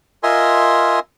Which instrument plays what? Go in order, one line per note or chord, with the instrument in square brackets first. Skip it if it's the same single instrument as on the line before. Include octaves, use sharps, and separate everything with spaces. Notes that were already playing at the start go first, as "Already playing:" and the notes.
[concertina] F4 A#4 D#5 E5 G#5 C6